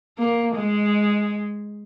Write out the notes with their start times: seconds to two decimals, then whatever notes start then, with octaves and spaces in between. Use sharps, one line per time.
0.18 A#3
0.55 G#3